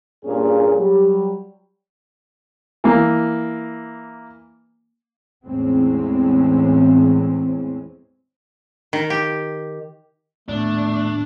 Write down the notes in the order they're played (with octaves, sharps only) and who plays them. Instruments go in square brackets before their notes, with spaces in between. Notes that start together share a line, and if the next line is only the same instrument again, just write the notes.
[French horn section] G2 A#2 A#3 C#4 G#4
F#3 G3 G4
[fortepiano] E3 A#3
[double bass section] E2 A2 E3 G#3 C4 C#4
[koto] D#3
G4
[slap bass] D#1 A2 B3 [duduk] A3 [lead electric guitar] D4